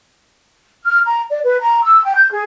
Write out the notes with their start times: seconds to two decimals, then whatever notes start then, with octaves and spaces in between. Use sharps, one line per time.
0.85 F6
1.06 A#5
1.31 D5
1.45 B4
1.61 A#5
1.84 E6
2.04 G5
2.16 G6
2.32 G#4